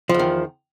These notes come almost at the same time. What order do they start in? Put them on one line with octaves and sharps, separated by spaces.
F3 E2 D#3